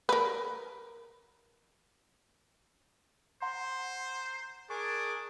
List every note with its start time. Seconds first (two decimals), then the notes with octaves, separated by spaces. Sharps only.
0.09 A#4 B4
3.42 C5 F#5 A#5 C6
4.70 D4 G#4 A#4 C#6 D6